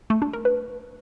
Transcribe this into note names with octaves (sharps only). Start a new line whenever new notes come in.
A3
D4
A#4
B4